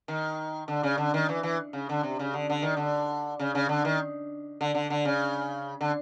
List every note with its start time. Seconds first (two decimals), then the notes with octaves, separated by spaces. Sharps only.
0.08 D#3
0.68 D3
0.83 C#3
0.98 D3
1.14 D#3
1.29 E3
1.43 E3
1.73 C#3
1.89 D3
2.03 C3
2.19 C#3
2.33 D3
2.50 D3
2.62 D#3
2.77 D3
3.40 C#3
3.55 C#3
3.69 D3
3.85 D#3
4.61 D3
4.75 D3
4.90 D3
5.05 C#3
5.81 D3